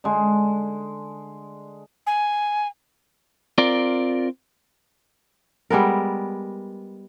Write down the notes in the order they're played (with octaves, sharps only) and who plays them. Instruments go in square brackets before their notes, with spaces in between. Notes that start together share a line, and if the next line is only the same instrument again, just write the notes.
[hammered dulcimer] D3 G#3
[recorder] G#5
[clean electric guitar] C4 F4 A#4 D5
[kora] G3 G#3 B3 A#4